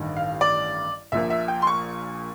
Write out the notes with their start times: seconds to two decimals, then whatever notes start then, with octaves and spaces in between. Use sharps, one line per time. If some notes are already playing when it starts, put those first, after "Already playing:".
Already playing: A1 G2 D#3
0.16 F5
0.41 D5
1.12 A#1 A#2 F3 A#3 E5
1.30 E5
1.48 G5
1.62 C6
1.67 C#6